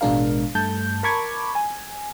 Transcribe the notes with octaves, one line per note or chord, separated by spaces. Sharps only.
A1 B2 G#3 D4 A#4 F5
G2 A3 A5 G6
A#4 A5 B5 C#6 D6 G#6
G#5